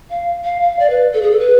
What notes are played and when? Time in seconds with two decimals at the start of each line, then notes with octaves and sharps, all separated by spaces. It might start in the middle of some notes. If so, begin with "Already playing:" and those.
0.10 F5
0.44 F5
0.61 F5
0.80 D5
0.90 B4
1.14 A4
1.22 G#4
1.31 A4
1.39 B4